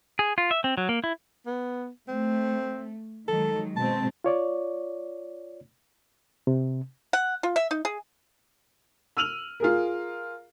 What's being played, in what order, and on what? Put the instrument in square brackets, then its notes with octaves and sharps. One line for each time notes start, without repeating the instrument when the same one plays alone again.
[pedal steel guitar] G#4
F4
E5
C4
F#3
A#3
E4
[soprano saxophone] B3
[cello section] A3 [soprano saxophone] C4
[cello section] D#3 F#3 G#3 [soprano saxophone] A4
[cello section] B2 G#3 C4 [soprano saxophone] A5
[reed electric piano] F4 C#5 D5
C3
[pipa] F#5
F4
E5
D#4
G#4
[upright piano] E6 F6 D#7 F7 F#7
F4 G#4 A#4